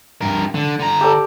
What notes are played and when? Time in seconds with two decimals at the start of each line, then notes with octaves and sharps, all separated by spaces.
0.21 G2 A#4
0.55 D3
0.80 D3 A#5
1.01 G4 A4 D5